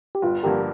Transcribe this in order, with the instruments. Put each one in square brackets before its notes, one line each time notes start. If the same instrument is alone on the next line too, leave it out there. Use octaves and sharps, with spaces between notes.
[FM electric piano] G4
[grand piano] G1 [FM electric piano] F4
[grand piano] G2 D3 F3 A#3 [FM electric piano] G4 A#4